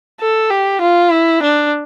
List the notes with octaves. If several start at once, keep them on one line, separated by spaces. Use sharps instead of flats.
A4
G4
F4
E4
D4